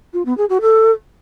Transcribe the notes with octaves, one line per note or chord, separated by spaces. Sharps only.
F4
B3
G#4
F#4
A4